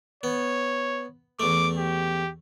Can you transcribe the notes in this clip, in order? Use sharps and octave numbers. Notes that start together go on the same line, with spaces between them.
B3 C#5
E2 A3 D6
G4